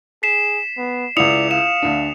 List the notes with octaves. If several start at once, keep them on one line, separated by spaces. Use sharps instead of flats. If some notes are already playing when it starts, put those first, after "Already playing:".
G#4 B6 C7 E7
B3
C#2 E4 D5 D#6 C#7 F7
F5 E7
D2 D4